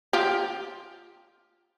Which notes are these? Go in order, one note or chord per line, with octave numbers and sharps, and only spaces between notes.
F4 G4